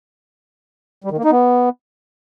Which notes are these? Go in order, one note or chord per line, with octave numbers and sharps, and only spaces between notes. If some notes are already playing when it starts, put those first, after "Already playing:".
G3
D#3
A#3
D#4
B3